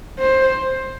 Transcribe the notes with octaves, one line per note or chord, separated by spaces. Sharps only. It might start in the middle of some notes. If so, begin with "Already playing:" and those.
C5